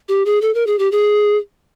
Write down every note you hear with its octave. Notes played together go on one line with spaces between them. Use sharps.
G4
G#4
A4
A#4
G#4
G4
G#4